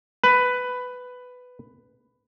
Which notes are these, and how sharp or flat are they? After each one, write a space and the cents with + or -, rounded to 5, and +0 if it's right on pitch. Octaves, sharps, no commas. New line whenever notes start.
B4 +10